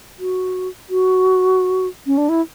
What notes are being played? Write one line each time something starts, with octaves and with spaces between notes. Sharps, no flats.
F#4
F#4
C#4
D4
E4